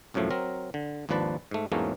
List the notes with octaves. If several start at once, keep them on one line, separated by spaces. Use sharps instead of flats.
C2 F#2 A2 F3 A3
F#3 C4 A#4
D3
G#1 D#2 F3 D4 B4 A5
G#2 A3
E2 G#2 F#3 A3 A#3 C#4